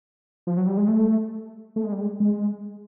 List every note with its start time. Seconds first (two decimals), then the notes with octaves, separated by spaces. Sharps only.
0.47 F3
0.57 F#3
0.67 G3
0.77 G#3
0.88 A3
1.76 A3
1.84 G#3
1.92 G3
2.01 G#3
2.20 G#3